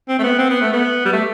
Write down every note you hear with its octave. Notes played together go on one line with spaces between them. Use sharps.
C4
A3
B3
C4
B3
A3
B3
G3
A3